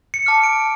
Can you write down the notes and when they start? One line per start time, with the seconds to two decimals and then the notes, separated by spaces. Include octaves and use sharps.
0.14 C#7
0.26 A5 D6 F6
0.43 D7